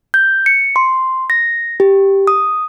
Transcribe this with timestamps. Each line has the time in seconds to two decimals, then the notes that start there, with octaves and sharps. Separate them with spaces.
0.14 G6
0.46 C#7
0.76 C6
1.30 A#6
1.80 G4
2.27 D#6